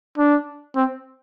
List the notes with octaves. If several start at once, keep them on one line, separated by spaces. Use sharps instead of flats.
D4
C4